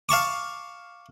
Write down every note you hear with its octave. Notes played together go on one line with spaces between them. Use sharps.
F5 A5 C#6 D6